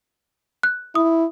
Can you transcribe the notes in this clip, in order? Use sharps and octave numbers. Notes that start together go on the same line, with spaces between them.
F#6
E4 D#6